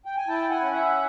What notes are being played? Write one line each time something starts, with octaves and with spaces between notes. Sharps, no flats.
G5
G#5
E4 G5 A5
F#5 G#5
C#4
E5 F#5